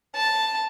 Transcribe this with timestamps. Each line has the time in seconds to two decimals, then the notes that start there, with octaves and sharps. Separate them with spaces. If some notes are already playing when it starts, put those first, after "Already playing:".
0.16 A5